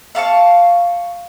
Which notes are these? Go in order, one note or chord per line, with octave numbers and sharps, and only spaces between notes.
E5 F5 A5 C#6